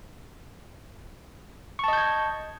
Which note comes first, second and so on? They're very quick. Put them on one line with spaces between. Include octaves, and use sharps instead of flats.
C#6 A5 D#5 G6 G#6